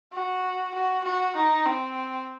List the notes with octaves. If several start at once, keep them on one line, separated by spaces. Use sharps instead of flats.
F#4
F#4
F#4
D#4
C4